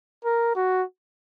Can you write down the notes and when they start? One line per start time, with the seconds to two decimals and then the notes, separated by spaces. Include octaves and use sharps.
0.25 A#4
0.56 F#4